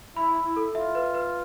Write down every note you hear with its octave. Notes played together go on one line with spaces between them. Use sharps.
E4 B5
B5
E4
A4
F4 E5
B4
B4